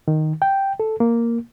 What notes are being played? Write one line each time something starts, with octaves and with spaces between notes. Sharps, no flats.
D#3
G5
A4
A#3